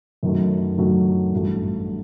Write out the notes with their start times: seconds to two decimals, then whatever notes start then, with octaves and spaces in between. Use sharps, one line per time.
0.23 F#2 D#3 F#3 A3
0.78 F#2 D#3 F#3 A3
1.33 A1 G2 F#3 A3